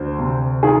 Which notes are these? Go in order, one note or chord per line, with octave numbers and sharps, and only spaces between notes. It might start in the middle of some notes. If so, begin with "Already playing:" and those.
Already playing: D2 C5
C3
D#3 G#4